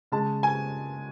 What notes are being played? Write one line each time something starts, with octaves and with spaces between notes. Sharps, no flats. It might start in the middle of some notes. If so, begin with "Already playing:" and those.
C#3 G#3 A5
G#5